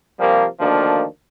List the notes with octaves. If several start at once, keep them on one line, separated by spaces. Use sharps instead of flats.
C3 F3 G3 A#3
D2 D#3 F3 A#3 D4